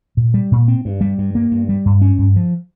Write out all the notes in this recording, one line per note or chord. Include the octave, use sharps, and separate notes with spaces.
A#2
G3
A#2
C4
G2
G3
G2
A#3
G2
G3
G2
C#4
G2
F3